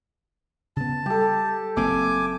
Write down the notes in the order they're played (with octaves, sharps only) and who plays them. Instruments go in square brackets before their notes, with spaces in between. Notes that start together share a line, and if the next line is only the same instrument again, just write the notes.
[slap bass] C#3 B3 [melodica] A5
[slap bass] G3 [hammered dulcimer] G4 A4
[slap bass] F#1 A#3 C4 [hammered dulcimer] E5 [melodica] G#5 D6